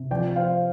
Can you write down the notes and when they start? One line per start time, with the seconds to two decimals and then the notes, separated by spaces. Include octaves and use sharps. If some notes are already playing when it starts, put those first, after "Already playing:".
Already playing: C3
0.11 F3 D5 G5
0.36 F3 C5 F5